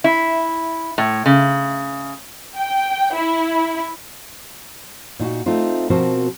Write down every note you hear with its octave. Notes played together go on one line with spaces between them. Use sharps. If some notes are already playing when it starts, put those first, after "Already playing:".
E4
A2
C#3
G5
E4
A#2 D#4 F4 F#4
A3 C4 D#4 F4
B2 F3 C4 F#4 A#4 C5